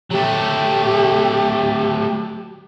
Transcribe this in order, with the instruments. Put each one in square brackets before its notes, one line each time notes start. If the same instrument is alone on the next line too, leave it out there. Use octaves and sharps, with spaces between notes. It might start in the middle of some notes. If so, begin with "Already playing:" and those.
[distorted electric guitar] F#3 A3 [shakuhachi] G4